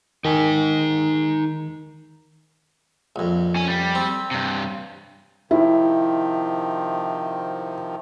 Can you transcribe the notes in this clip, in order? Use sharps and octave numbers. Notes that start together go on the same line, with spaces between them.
D#3 D#4 G#5
A#1 F2
C#4 G#5
G3
C4
G2 C3
C3 D#3 F3 E4